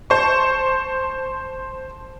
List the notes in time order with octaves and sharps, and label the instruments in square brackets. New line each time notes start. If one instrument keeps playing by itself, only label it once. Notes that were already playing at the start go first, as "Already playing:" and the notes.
[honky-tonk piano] C5 A5 C#6